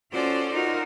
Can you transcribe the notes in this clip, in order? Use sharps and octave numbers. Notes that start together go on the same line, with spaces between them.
C#4 F4 F#4 A4 C5 D5
D#4 F4 F#4 A#4